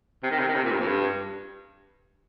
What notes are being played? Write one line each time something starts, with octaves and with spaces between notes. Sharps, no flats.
C3
D#3
C3
D#3
C3
A#2
G2
F2
G2